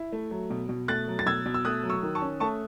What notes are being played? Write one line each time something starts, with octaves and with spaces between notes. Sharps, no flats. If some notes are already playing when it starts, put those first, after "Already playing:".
Already playing: E4
A3
F#3
B2
B2
A3 F#6 A6
F#3
A6
B2 E6 G#6
B2
E6
A3 D#6 F#6
F#3
C#6 E6
D#3
A5 C#6
C#4
A3 A5 C#6